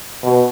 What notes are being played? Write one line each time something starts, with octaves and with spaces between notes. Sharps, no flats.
B2